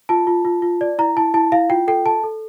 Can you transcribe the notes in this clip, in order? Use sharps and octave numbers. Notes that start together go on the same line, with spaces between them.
F4 A5
F4
F4
F4
D5
E4 A#5
E4 A5
E4 A5
E4 F5
F4 G5
A4 G5
A4 A5
A4